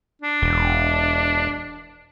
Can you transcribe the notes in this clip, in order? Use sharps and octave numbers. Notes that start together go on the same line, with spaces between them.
D4
E1